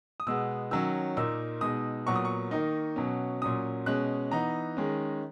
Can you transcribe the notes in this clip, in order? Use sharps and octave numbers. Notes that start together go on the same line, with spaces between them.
D#6
B2 G#3 B3 E6
D#3 F#3 C#4 E6
A#2 A#3 D#4 E6
B2 G#3 D#4 D#6
A#2 F#3 B3 C#6
D#6
C#6
D#3 A#3 D#4
B2 F#3 C#4
A#2 F#3 C#4 D#6
B2 G#3 C#4 F#6
E3 B3 D#4 A#5
D#3 G#3 C#4